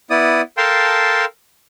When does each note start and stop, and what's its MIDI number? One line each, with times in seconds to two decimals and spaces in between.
0.10 0.41 59
0.10 0.41 64
0.10 0.41 74
0.10 0.41 87
0.57 1.25 69
0.57 1.25 70
0.57 1.25 77
0.57 1.25 79
0.57 1.25 81
0.57 1.25 84